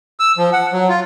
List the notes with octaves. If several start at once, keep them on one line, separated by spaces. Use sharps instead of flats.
E6
F3
F#5
F#3
F4